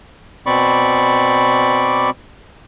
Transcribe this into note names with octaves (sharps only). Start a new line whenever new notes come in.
B2 C4 D5 B5 C#6 D6